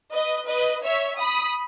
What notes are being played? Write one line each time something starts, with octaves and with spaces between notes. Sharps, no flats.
B4 D#5
B4 D#5
C#5 E5
B5 D#6